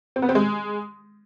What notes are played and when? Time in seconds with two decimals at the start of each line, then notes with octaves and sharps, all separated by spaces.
0.16 C4
0.22 B3
0.29 C4
0.35 G#3